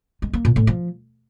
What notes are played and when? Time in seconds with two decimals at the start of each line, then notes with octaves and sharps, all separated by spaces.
0.22 G#3
0.33 A#3
0.45 A#2
0.56 A2
0.67 F3